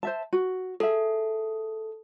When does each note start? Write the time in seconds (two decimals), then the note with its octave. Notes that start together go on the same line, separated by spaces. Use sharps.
0.03 C5 E5 A5
0.33 F#4
0.80 G#4 A4 E5